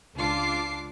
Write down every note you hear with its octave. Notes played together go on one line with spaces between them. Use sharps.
C#2 D4 F4 A5 D6 C7